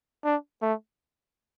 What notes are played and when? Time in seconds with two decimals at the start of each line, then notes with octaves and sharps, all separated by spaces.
0.25 D4
0.62 A3